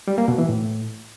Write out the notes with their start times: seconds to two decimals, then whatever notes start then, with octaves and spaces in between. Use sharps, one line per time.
0.08 G3
0.18 A#3
0.28 B2
0.38 E3
0.49 A2